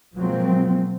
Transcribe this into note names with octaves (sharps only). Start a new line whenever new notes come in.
B2 F3 F#3 G#3 A#3 C4